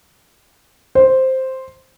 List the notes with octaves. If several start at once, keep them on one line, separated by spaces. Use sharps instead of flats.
C5